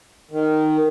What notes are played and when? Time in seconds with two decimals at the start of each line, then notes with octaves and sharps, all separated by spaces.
0.31 D#3